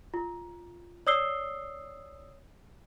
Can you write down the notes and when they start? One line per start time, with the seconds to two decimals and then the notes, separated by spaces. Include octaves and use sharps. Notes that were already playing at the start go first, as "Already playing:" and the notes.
0.14 F4
1.07 C#5 D5 D#6 E6 C7 G7